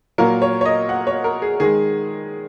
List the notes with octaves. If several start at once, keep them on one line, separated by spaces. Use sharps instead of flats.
A#2 F#3 A#3 A#4
C#5
C#5
D#5
F#5
C#5
A#4
G#4
D#3 G#3 G#4